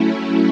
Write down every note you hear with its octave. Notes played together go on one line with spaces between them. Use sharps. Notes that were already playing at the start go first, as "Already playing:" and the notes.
Already playing: F#3 A3 C#4 E4